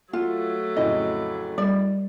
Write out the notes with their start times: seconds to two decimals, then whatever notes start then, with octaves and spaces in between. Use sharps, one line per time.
0.13 F#3 A3 F4 F#5
0.77 F2 A2 C#3 D#5
1.58 G3 D5